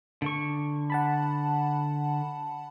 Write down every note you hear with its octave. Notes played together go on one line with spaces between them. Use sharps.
D3 C#6
F#5 A5 B5